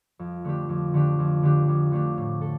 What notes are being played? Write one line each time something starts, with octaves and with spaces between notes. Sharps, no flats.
F2
D3 A3 D4 G4
F2
D3 A3 D4 G4
F2
D3 A3 D4 G4
F2
D3 A3 D4 G4
A2
A4